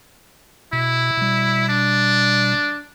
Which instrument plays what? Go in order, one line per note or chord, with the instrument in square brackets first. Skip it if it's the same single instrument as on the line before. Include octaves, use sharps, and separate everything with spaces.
[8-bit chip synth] B2 [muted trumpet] E4
[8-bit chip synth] B2 G3
[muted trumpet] D4